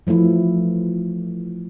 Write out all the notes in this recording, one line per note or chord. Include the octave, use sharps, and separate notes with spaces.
E3 F3 A3 E4